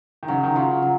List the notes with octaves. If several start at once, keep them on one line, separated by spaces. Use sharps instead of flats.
D#3
C#3 F#3
D#3
C#3 F4
F#3